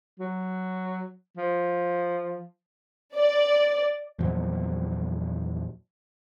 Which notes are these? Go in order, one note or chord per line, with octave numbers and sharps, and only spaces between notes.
F#3
F3
D5
E2 A#2 F3 F#3